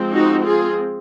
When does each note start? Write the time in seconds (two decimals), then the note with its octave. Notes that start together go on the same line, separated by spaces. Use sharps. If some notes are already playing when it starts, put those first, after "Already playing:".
Already playing: F3 G#3 C4
0.13 D#4 F#4
0.46 F4 G#4